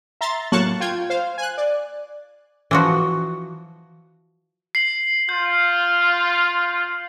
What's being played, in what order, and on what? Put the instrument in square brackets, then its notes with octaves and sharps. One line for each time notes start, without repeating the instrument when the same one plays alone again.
[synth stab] E5 A#5 C6 A6
A2 F#3 A#3 A5 C#6 F#6
F4 G5 G#6
C5 F5
G#5 F#6
D5
[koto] E3 F3 F#4
[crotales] C7 F#7
[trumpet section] F4 [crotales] G6